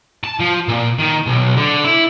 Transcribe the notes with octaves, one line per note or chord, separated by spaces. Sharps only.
A5
F3
A#2
D#3
B1
D3
E4